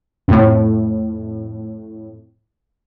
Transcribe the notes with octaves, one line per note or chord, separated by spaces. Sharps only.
F2 A2